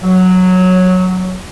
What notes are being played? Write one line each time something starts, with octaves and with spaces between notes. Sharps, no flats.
F#3